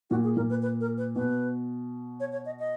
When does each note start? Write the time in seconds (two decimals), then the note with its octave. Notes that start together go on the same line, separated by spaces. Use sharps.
0.10 A#2 F#4
0.24 G#4
0.36 A#2 A#4
0.50 B4
0.62 B4
0.81 A#4
0.98 B4
1.16 B2 B4
2.20 C#5
2.32 C#5
2.46 D#5
2.59 D#5